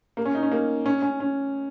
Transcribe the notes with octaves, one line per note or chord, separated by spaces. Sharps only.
A#3
C#4
D#4
C#4
A#3
C#4
C#4
C#4